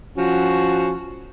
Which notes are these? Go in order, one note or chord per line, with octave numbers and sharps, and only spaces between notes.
F3 C#4 F#4